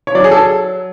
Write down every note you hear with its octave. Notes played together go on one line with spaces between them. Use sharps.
C#5
F#3 D5
G#4
A4